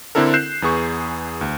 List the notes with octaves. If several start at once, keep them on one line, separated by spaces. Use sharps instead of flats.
D3 C4 D4 E4 A4 A#4
F#6 G6 C7 E7
E2 B3 G#4 C#6
D2